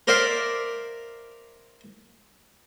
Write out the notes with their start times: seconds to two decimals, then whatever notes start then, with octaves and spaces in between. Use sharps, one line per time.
0.07 A#4 C5 D5 E5 F5